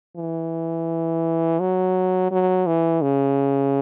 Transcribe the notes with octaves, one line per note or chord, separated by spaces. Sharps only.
E3
F#3
F#3
E3
C#3